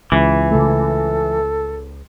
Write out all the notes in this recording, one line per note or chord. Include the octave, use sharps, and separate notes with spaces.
C#2 E3
C#3 A3 A4